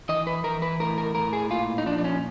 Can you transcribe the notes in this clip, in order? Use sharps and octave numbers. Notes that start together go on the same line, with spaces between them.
E3 D#5
B4
E3 A#4
B4
A2 A#4
A#4
A2 A#4
G#4
A#2 F4
D#4
F3 D4
D4
C#4